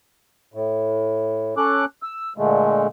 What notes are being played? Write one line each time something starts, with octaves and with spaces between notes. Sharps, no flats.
A2
C#4 A4 D6 F#6
E6
A#2 D3 G#3 A3